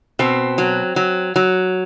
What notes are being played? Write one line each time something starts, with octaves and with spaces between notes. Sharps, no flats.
B2 C4
F#3
F#3
F#3